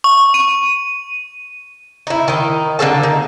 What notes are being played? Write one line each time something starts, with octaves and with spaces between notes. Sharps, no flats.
C#6
D#7
D#4 E4
D#3 D#4
D3 A#3 A4 A5
D#4